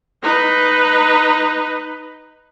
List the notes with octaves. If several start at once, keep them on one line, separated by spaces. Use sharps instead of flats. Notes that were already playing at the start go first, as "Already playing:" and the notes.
D#4 B4